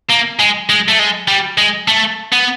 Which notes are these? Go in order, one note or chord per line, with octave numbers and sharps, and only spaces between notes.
A#3
G#3
G#3
A3
G#3
G3
G#3
A3
B3